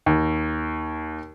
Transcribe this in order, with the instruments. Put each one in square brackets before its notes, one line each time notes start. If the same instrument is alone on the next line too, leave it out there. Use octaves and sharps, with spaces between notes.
[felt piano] D#2